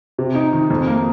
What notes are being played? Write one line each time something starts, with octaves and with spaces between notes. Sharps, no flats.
C3
D#4
D#3
F2
A#3